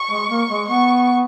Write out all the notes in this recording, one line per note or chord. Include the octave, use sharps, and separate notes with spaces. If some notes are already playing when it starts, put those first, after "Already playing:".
Already playing: C#6
G#3
A#3
G#3
B3 C#6